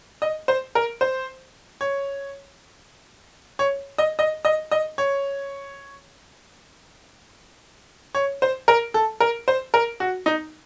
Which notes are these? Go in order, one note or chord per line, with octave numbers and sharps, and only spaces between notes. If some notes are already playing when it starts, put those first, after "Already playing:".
D#5
C5
A#4
C5
C#5
C#5
D#5
D#5
D#5
D#5
C#5
C#5
C5
A#4
A4
A#4
C5
A#4
F#4
D#4